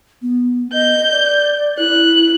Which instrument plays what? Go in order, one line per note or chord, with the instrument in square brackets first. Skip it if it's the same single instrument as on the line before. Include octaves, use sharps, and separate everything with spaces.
[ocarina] B3
[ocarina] D#5 [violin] G6
[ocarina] D5
[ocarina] E4 [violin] F#6